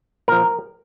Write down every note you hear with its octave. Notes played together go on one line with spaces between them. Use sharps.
A#2 F3 A#4